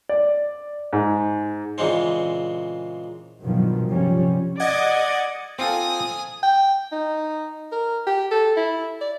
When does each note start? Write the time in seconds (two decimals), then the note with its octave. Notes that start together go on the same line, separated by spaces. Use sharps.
0.09 D5
0.93 G#2
1.78 A#2 C#3 E3 G#3 C4
3.42 G2 B2 D#3 F3 F#3
3.88 C3 F3 G3 C#4
4.60 D5 D#5 F#5 G#6
5.59 C4 F4 A4 G#5 D#6
6.43 G5
6.92 D#4
7.72 A#4
8.07 G4
8.32 A4
8.57 E4
9.01 D5